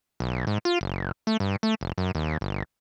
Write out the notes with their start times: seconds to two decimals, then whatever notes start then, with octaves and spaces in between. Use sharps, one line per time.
0.20 B1
0.47 G#2
0.65 F4
0.81 F#1
1.27 A3
1.40 G2
1.63 A3
1.81 F1
1.98 F#2
2.15 D#2
2.41 G1